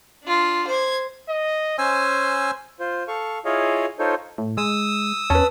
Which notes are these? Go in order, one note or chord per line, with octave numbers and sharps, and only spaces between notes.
D4 F4
C5 G#6
D#5
C#4 C5 G#5 E6
F4 C5
A4 F5 C#6
E4 F4 G#4 C#5 D#5 F5
D#4 F4 A4 C5 C#5
A2
G#3 D#6 E6
E2 C#4 B4 A5